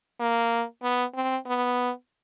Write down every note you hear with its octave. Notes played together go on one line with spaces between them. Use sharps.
A#3
B3
C4
B3